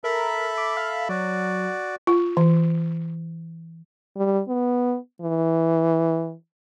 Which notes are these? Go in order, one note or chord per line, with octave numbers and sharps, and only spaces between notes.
A4 A#4 E5 B5
D6
F5
F#3 F#4 D5
F4
E3
G3
B3
E3